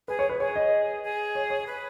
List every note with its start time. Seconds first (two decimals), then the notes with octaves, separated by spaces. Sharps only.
0.08 G#4 B4
0.19 C#5
0.29 B4
0.40 G#4 C#5
0.56 D#5
1.03 G#4
1.35 C#5
1.50 C#5
1.67 B4